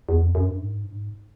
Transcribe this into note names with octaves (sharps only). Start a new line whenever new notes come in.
E2
F2
F#2
G2
G#2
G2
G#2